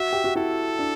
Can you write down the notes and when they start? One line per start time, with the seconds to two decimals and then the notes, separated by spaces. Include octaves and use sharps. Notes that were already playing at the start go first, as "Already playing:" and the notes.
Already playing: F#4 E5
0.13 G4
0.24 F#4
0.36 E4 A4
0.79 D4